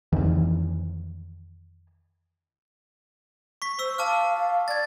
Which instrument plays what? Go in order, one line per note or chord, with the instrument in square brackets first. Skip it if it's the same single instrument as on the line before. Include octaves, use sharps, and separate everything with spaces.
[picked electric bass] F2 D#3 E3
[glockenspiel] C#6 B6
[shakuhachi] C5 [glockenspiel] C#6 E6
[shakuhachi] F5 [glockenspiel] A5 D6 F6
[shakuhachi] F5
[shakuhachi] D5 [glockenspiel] G#6 A6